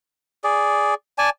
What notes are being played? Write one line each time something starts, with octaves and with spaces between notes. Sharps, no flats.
G#4 D5
D5 G#5 A5